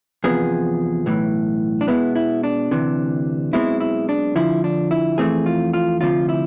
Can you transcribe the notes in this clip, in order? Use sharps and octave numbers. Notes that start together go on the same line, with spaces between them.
E2 C3 F3 B3 G#4
B1 A2 E3
D4
B2 G#3 B3 E4
E4
D4
D2 C3 E3
B1 B2 G#3 C4 E4
E4
D4
F2 D3 F3 E4
D4
E4
F2 E3 A3 C4 G#4
F4
F4
D2 C3 F3 F4
E4